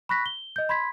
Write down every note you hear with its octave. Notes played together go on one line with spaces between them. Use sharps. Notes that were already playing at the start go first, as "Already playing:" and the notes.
B5 C#6 F#6 A#6 B6
G7
D#5 G6
B5 C6 G#6 B6